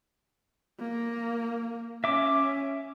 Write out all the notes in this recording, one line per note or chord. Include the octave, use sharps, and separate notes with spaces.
A#3
C#4 E5 D6